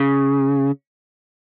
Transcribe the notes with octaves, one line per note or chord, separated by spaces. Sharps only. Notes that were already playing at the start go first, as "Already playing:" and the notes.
Already playing: C#3